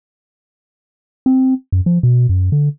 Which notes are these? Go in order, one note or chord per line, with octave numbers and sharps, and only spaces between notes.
C4
F#2
F3
B2
F#2
D3